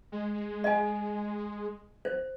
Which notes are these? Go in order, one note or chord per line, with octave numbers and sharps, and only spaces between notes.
G#3
D#5 G#5
C5